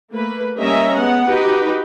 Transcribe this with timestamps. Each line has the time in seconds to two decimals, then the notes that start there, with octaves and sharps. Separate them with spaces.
0.12 A3 A#3 B4
0.57 G3 A#3 C#4 D#5 E5 A#5
0.96 G#3 B3 F#5
1.28 D#4 F#4 G4 B4